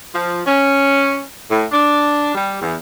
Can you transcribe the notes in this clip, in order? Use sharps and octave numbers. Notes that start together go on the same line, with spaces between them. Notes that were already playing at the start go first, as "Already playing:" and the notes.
F3
C#4
A2
D4
G3
E2